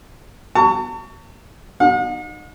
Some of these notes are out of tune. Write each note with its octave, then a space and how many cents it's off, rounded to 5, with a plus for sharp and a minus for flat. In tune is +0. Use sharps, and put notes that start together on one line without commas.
A5 +45 C#6 +25
D#4 -30 F#5 -45